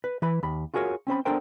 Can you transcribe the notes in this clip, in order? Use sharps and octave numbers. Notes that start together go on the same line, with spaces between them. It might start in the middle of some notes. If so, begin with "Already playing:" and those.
B4
E3 B4 B5
D#2 B5
F4 F#4 G#4 A#4 C#5
C4 C#4 C5 B5
B3 D4 A4 A#4 C5 G5